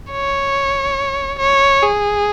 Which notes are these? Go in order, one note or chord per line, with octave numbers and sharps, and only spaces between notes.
C#5
C#5
G#4